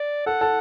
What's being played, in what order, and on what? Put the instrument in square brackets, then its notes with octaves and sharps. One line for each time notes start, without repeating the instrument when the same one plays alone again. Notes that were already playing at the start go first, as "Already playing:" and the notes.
Already playing: [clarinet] D5
[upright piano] A4 [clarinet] F#5
[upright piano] A4